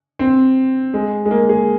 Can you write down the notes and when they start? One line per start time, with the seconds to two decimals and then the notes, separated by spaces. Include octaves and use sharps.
0.19 C4
0.94 G#3
1.25 G#3
1.31 A#3
1.49 G#4